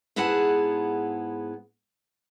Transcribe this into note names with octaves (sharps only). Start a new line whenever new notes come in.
G#2 B3 E4 G#4 F#5 A5